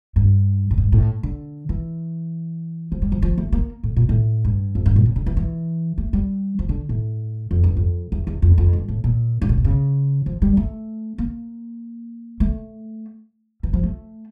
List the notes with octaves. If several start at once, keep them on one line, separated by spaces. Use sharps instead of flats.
G2
A2
G2
A2
D3
E3
F3
G3
F3
F3
A3
A#3
A2
A#2
A2
G2
F2
G2
A#2
C#3
D3
E3
E3
A3
G3
F3
D3
A2
F2
G2
F2
E2
E2
F2
F2
G2
A2
A#2
G2
A2
A#2
C#3
F3
G3
A3
A#3
A3
E3
F3
A3